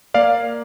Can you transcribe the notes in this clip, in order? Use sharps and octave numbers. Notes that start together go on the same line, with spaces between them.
A#3 D5 F5